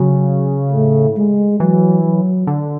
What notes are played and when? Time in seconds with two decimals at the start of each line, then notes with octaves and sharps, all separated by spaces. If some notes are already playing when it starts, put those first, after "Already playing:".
Already playing: C#3 F#3
0.72 A2 A3
1.16 G#3
1.59 E3 F#3
2.04 F#3
2.47 D3